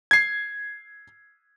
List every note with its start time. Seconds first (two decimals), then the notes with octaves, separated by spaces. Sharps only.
0.11 G#6 C7